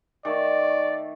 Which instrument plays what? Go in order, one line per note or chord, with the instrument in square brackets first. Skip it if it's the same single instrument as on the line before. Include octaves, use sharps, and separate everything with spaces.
[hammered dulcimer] D#3 A3 A4 [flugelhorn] D5